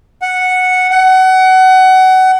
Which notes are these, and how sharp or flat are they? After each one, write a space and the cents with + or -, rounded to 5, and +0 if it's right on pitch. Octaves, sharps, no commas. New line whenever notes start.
F#5 -5
F#5 +25